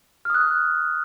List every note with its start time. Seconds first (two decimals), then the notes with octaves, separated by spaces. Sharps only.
0.25 F6
0.30 D#6
0.35 F#6